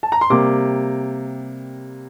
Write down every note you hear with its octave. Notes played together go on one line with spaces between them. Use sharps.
A5
A#5
C6
C3 G3 A#3 D6